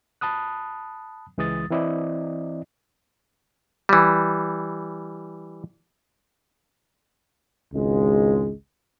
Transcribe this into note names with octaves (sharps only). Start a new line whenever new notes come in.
A5 B5 D#6 F#6
C#2 E3 G#3 D#6 A6
E3 C4 E4 D5 D#5
E3 G3
G#1 C#2 G#3